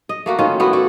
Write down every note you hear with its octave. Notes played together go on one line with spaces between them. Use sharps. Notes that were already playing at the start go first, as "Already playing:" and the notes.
D#5
A3 A#3 F#4
D#3 C#4 F4
A3 B3 E4 F#4
F#4 A4 D5